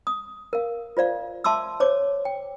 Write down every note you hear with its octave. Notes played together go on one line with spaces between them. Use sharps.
D#6
A#4 F5
F4 C5 D5 F5
E5 A5 C6 D6 E6
C5 C#5 D6
G5